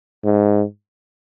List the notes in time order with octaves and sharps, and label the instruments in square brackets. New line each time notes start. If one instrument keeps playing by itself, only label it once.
[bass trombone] G#2